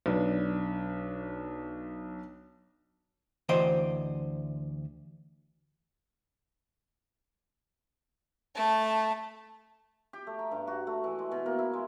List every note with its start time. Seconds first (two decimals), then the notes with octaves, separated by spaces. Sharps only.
0.06 B1 D4 B4
3.49 D2 E3 C5 D#5 G5
8.55 A3 A5
10.13 G4
10.27 A3
10.39 A#5
10.51 G2
10.67 F#4
10.87 A3
11.04 E3
11.19 G#3
11.31 B2
11.46 A#3
11.59 E4
11.73 G#3